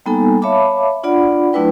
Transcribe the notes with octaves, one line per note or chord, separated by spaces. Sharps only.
G3 A#3 B3 D#4 A4 G#5
C#5 E5 F5 A5 B5 D6
D4 F4 D5 F#5 B5
F#3 A3 D4 E4 B4 G5